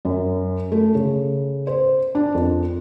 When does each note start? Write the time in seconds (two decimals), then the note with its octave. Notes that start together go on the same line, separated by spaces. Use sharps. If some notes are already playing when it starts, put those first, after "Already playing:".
0.05 F#2
0.72 A3
0.95 C#3
1.67 C5
2.15 D4
2.35 F2